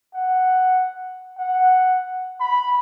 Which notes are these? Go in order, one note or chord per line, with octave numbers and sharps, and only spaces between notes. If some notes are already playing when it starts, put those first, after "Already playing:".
F#5
F#5
B5